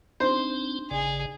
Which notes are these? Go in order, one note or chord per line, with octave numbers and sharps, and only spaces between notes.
C4 D4 D#4 C5
G#1 C#3 G#4 D5